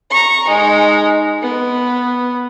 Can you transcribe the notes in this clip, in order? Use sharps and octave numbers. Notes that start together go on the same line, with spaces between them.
A#5 C#6
G#3 D#4
B3